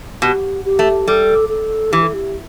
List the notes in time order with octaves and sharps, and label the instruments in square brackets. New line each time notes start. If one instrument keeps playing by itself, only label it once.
[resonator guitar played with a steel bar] B2 [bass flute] G4
[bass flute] G4
[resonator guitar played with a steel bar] A3
[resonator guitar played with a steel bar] G3 [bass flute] A4
[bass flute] A4
[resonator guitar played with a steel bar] E3 [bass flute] G4
[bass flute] A4
G4